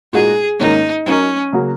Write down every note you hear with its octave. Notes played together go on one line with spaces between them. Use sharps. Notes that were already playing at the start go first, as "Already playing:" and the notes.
A#2 G#3 D#4 F#4 G#4
G#2 D#3 A#3 C#4 D#4
F#3 C#4 D#4 A#4
C#3 F#3 A#3 F#4